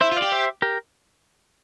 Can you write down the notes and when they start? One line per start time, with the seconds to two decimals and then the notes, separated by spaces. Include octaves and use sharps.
0.01 E4 C5 E5
0.12 F4
0.16 D5 F5
0.22 G4
0.32 C5 E5
0.62 G4 A#4